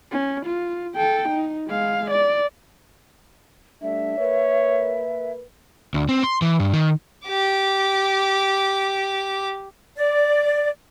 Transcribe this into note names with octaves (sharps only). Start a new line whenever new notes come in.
C#4
F4
A4 G5
D#4
G#3 F5
D5
G3 A3 D4 E5
A#3 A#4 B4 C#5
D2
C4
C6
E3
G2
D#3
G4 D6
D5